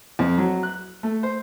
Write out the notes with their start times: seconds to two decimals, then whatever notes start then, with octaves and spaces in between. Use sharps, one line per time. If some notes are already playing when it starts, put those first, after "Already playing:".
0.19 F2
0.38 F#3
0.63 F#6
1.03 A3
1.23 C5